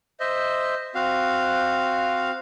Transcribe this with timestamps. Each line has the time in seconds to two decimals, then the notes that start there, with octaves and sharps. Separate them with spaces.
0.20 C5 D#5 E5
0.95 C4 F#4 F5